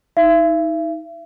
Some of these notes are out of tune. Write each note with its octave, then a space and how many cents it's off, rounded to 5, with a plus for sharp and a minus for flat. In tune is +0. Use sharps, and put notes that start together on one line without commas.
D#4 +30 E5 +40